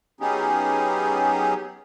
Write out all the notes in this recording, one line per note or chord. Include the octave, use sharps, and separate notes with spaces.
F#3 B3 C#4 D#4 G4 G#4